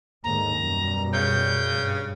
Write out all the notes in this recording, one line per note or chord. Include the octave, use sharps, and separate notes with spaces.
D#2 G#2 D3 A#5
F#2 B2 G3
C#3 G6
G2